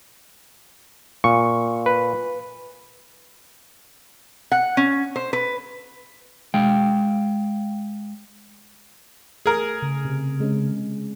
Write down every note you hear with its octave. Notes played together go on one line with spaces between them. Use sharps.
A#2 C#6
B4
F#5
C#4
C5
B4
G#3 F5 G5
A3 G#4 A#4
C#3
C3
G#3 C#4